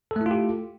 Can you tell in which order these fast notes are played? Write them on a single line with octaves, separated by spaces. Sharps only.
A4 A3 E4 F4 G4